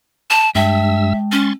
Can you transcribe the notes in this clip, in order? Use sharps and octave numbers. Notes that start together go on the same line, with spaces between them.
A5
G2 G#3 E5 G5 A5 E6
C#4 C6 C#6 A6